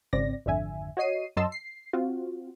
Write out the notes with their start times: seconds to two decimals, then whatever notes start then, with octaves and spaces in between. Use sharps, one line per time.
0.13 G#1 C#3 C4 D5 A#6
0.46 G#1 F2 D3 E5 G#5
0.97 F#4 C#5 D#5 C7 D#7
1.37 F#2 F#3 D#5 A5 C6 E6
1.52 C7
1.93 C4 F4 F#4